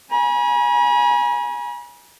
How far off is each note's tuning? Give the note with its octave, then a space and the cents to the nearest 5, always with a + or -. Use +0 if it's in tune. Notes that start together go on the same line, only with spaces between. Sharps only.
G#5 +0 B5 -45